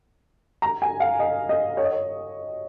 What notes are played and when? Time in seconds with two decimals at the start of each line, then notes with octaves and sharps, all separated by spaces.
0.62 A#5
0.82 G#5
1.00 F5
1.20 D#5
1.49 D#5
1.77 C#5
1.84 D#5
1.91 C#5